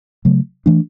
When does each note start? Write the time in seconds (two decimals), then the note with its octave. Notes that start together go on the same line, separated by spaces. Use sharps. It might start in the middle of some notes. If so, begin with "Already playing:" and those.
0.25 C#3 F#3 A3
0.66 E3 A3 D4